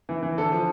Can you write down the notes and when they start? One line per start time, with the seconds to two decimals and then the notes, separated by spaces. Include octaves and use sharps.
0.09 E3
0.23 E3
0.38 D3 A4
0.52 F3